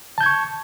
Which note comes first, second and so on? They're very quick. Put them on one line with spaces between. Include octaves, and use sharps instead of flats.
A5 G6 G#6 C#6